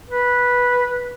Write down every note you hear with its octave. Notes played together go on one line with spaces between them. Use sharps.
B4